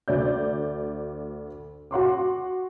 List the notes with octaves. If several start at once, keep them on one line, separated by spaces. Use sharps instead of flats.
D2 D5 G6
F#4 F#5 C6 D6